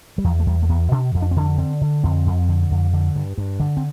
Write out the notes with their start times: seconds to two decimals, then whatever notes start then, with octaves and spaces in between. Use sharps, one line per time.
0.18 G3
0.24 E2 F3
0.40 A3
0.46 E2 G3
0.63 A3
0.69 E2 B3
0.92 B2 D4
1.15 F2
1.22 D4
1.31 C4
1.36 D3 D4
1.58 D3 C4
1.81 D3
2.04 F2 C4
2.26 F2
2.49 D3
2.71 F2
2.93 D3
3.16 G2
3.38 G2
3.60 D3
3.77 C4